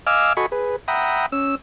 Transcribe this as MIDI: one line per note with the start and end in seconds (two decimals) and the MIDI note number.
0.07 0.33 75
0.07 0.33 77
0.07 0.33 80
0.07 0.33 86
0.07 0.33 88
0.07 0.33 89
0.37 0.46 66
0.37 0.46 69
0.37 0.46 75
0.37 0.46 80
0.37 0.46 83
0.37 0.46 85
0.52 0.76 68
0.52 0.76 71
0.88 1.26 76
0.88 1.26 78
0.88 1.26 79
0.88 1.26 82
0.88 1.26 83
0.88 1.26 87
1.32 1.55 61
1.32 1.55 88